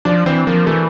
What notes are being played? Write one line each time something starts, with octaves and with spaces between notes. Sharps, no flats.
F3 D4
E3 C4
F3 A#3
E3 A3